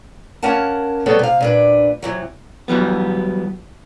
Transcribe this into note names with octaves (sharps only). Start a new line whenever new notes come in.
A#3 C#4 A#4 F#5 A5
F#3 G3 B3 G#4 A4 C#5
C3 F5
A#2 D4 B4
C3 E3 F#3
E3 F#3 G3 B3